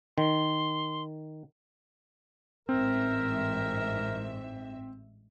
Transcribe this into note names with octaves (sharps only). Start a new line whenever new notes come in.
D#3 C6
A1 G#2 C4 A#4 E5